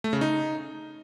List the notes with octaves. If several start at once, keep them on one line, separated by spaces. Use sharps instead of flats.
A3
C#3
D#4